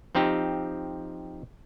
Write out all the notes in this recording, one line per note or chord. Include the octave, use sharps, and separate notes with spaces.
F3 C4 D#4 G4